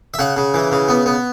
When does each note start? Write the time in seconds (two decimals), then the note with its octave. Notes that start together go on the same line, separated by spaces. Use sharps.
0.14 E5
0.19 C#3 F#5
0.36 C#3
0.54 E3
0.72 C#3
0.88 B3
1.06 B3